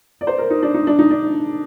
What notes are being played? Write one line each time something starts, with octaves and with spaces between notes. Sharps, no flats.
D5
C5
A#4
D#4
D4
D#4
D4
D#4
D4